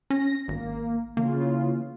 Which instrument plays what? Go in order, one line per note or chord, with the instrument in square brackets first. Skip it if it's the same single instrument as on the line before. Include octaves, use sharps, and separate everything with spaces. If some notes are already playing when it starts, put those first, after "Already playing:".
[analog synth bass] C#4 [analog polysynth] A#6
[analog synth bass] G#1 [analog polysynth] A#3
[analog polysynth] C#3 E3 F4 [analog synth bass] A#3